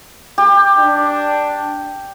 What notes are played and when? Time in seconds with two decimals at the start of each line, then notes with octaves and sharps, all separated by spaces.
0.38 G4
0.78 D4